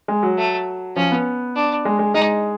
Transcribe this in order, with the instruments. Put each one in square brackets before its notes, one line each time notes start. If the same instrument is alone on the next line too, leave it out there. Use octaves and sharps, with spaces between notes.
[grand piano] G#3
F#3
[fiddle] A3
[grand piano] F3 [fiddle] C#4
[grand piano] B3
[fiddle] D4
[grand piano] G#3
G#3
[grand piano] G#3 [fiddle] D#4